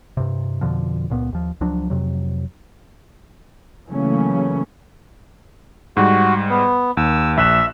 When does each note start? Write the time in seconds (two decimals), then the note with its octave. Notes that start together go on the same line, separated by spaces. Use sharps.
0.17 G2 C3
0.61 F2 B2 D3 F3
1.10 C#2 A#2 B3
1.33 D#2 F3
1.61 C#2 F3 F#3 D4
1.90 F2 C3 F#3
3.87 C#3 E3 F#3 A3 A#3 C#4
5.97 G#2 G3 F#4
6.50 B3
6.97 D#2 E6
7.37 A#1 E5 F#6 E7